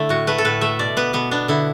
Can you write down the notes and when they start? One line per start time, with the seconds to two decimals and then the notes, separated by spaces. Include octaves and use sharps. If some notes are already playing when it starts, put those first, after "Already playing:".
Already playing: D3 A3 E4
0.09 A2 F#4
0.27 A3 B4
0.38 A4
0.45 A2 B4
0.61 A3 E5
0.79 B2 D5
0.97 B3 B4
1.13 B2 B3
1.31 B3 D4
1.48 D3 E4